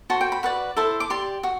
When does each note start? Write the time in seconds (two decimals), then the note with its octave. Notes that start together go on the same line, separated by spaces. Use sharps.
0.10 F#4 C5 A5
0.21 G5
0.32 B5
0.43 F#4 B4 D5
0.77 E4 A4 C5
1.00 D6
1.10 G4 D5 C6
1.43 F#4